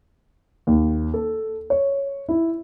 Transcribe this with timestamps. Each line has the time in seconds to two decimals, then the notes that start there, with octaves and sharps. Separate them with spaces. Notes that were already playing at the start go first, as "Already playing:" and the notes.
0.67 D#2
1.14 A4
1.70 C#5
2.29 E4